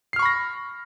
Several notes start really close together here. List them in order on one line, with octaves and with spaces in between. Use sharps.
C7 F6 C#6 B5 A#6